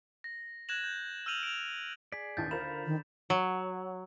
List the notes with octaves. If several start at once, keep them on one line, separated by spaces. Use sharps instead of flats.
A#6
F#6 G#6 A#6 E7 F#7
G6
E6 F6 G6 D#7 F7 F#7
D7 F7
G#4 D5 B6
A1 D#2 G6 A6
D3 F4 A#4 C5 A#5 B5 E7
D#3
F#3